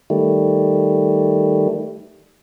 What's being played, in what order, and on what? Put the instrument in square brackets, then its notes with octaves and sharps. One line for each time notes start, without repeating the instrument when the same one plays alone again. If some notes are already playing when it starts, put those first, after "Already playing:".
[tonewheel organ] D#3 G3 A3